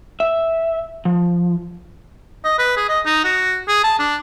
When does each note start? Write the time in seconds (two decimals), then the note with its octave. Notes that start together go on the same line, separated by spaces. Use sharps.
0.20 E5
1.05 F3
2.45 D#5
2.59 B4
2.77 G#4
2.89 D#5
3.06 D#4
3.24 F#4
3.68 G#4
3.84 A5
3.99 D4